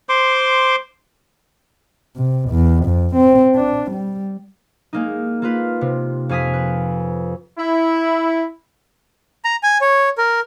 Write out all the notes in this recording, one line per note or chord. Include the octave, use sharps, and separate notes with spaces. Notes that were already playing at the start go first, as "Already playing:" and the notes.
C5 C6 D6
C3
E2
F2
C4
D4
G3
G#3 A#3 D#4
A#3 F4 B4
C3
F2 F5 G#5 D#6 B6
B4
E4
A#5
G#5
C#5
A#4